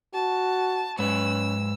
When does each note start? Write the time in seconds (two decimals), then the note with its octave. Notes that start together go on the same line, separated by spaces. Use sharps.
0.14 F#4 A5
0.99 G#2 G#3 C#4 B4 E6